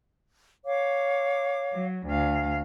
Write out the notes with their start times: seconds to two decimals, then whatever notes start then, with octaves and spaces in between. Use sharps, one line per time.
0.66 C#5 F5 D6
1.73 F#3
2.07 D2 F5